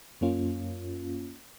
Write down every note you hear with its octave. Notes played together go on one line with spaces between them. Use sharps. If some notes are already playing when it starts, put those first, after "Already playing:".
F#2 A#3 C#4 F4